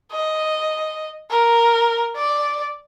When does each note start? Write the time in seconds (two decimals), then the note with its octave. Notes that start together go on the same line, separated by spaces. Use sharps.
0.12 D#5
1.30 A#4
2.16 D5